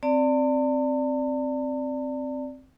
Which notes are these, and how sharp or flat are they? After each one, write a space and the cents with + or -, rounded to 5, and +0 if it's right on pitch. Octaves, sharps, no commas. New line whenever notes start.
C4 +0 D5 +0 A5 +45